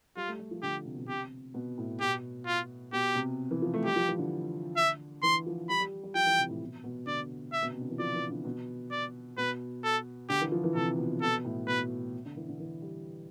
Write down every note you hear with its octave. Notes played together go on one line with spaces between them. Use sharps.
G3 F4
A3
G3
F3
D3 G4
C3
B2
C3 G4
B2
A2
B2 G4
F4
B2 G4
C3
E3
F3
A3
G3 G4
F3
E3
D3
E5
E3 C6
F3
G3 B5
G3
G3
F3 G5
E3
C3
A2
B2
B2
D3 D5
E5
B2
C3
D3
E3
F3 D5
E3
D3
B2
D5
B2 B4
A4
D3 G4
E3
F3
E3
C3 A4
B2
B2 A4
A2
B2 B4
D3
E3
D3
E3
G3